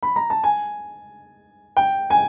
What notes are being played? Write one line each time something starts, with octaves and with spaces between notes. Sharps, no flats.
B5
A#5
A5
G#5
G5
G#5